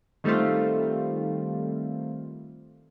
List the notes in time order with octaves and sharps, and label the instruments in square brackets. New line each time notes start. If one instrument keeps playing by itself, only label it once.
[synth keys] D#3 G3 A3 C4 F4